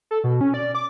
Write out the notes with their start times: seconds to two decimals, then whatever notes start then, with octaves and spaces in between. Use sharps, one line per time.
0.11 A4
0.24 B2
0.41 C#4
0.54 D5
0.75 D6